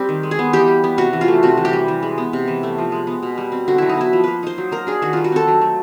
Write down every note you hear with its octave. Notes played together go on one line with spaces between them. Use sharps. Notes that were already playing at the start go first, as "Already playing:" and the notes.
Already playing: G3 C4 G4
D#3
G#3
G#4
B3
E3 G4
G3
B3
C3 F#4
E3
F4
A3
C3 F#4
E3
G4
G3
E3
G#3
B3
C3
E3
A3
F3
G#3
B3
B2
G3
C4
D3 F#4
F#3 E4
D#4
B3 E4
F3
A#3 B4
D#4 C5
F#3
A#3 A#4
D4 G#4
D#3 F#4
G3 F4
F#4
C4 A4
F#3
A3